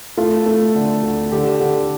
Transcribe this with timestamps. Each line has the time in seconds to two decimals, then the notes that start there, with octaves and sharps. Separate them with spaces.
0.17 A3 F4
0.46 A3
0.75 D3
1.03 D2
1.32 D3 G4
1.60 D3